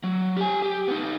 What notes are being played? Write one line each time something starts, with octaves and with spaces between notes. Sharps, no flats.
F#3
G4 G#5
G4
B3 D#4